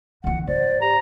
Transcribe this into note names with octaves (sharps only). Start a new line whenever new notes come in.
D3 E3 A#3 F#5
G#2 C5 D5
G4 A#5